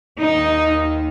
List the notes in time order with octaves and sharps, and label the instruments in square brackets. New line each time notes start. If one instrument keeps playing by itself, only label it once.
[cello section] D#2 D#3 D#4